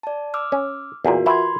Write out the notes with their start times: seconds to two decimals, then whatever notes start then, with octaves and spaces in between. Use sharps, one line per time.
0.03 D5 A5
0.34 D6 E6 F6
0.52 C#4
1.05 E2 A#2 F4 F#4 A#4
1.26 E3 E4 F#4 B5 C6 G#6